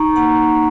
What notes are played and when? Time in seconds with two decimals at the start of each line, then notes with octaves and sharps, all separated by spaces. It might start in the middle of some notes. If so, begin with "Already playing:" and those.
Already playing: D#4 A#5 C#6
0.16 A#3 F#5 A#5